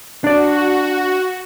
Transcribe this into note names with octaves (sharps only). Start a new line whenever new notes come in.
D4 F#4 D5